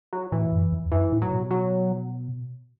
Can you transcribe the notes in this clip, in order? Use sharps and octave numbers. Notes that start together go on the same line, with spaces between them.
F#3
A2 E3
F#2
E2
F#2 E3
A2
F#3
B2
F#3